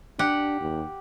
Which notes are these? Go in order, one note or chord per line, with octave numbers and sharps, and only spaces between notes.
D4 G4 F#5
D#2